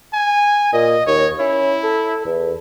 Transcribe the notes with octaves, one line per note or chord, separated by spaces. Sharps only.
G#5
A#2 D#5
D#2 C#5
C#4 E4
A4
E2